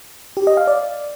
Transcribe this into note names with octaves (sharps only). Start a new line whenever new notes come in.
G4
D#5
F5
D5